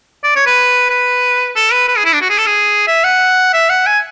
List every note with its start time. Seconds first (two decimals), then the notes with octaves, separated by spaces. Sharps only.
0.24 D5
0.36 C#5
0.47 B4
0.90 B4
1.56 A4
1.72 B4
1.88 B4
1.97 G#4
2.05 E4
2.13 D4
2.22 F#4
2.30 G#4
2.38 A4
2.47 G#4
2.87 E5
3.04 F#5
3.54 E5
3.70 F#5
3.86 G#5